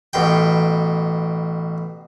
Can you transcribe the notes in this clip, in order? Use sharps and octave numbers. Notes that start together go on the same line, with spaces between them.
A1 B2 G5